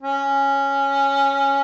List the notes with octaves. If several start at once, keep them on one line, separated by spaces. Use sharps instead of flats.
C#4